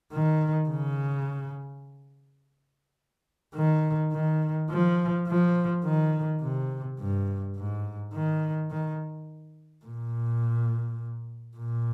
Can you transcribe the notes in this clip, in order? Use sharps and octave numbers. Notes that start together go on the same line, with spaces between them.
D#3
C#3
D#3
D#3
F3
F3
D#3
C3
G2
G#2
D#3
D#3
A#2
A#2